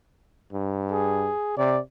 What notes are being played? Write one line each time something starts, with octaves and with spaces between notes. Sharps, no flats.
G2
G#4
C3 D5